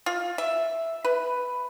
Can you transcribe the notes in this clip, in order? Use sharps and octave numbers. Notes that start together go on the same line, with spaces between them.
F4
E5
B4